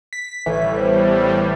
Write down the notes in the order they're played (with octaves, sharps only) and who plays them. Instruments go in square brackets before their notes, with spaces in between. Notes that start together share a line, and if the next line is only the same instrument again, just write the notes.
[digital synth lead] B6
[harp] A1 C#5 [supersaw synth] A2 G3 [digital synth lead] E3
[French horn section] B3 A4 C5